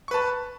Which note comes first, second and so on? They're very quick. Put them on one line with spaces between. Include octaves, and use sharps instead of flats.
C#6 B4 A5